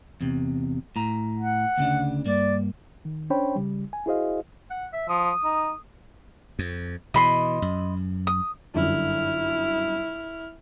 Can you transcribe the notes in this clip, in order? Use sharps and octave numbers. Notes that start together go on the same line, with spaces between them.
E2 C3
A2 A#5
F#5
D2 C#3 D4
G2 A#3 D5
D#3
C#4 D4 C5 C#5 G5 B5
C#3 G3
G#5
E4 F#4 G#4 C5 D#5 F5
F#5
E5
F3 D#6
D#4
F2
B2 E3 D#5 B5 C6
F#2
D#6
G1 F#2 D3 E4 F6